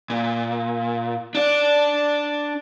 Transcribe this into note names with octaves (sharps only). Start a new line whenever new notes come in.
A#2
D4 D5